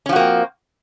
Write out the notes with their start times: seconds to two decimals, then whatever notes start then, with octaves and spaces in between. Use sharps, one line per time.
0.06 C#4
0.09 F3
0.12 F#4
0.16 A#3
0.19 C4